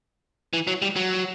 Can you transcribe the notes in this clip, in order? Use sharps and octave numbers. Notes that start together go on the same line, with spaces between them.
E3
F#3
G3
F#3